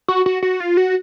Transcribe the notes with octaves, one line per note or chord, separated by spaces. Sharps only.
F#4
F#4
F#4
F4
F#4